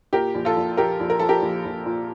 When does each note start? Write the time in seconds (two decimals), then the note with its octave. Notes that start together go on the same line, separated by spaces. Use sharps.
0.13 A#2 G4 A#4
0.35 A#1
0.45 F4 A4
0.57 A#1
0.77 A#1 G4 A#4
1.00 A#1
1.10 A#4
1.20 F3 A4
1.29 G4 A#4
1.42 A#1
1.65 A#1
1.86 A#2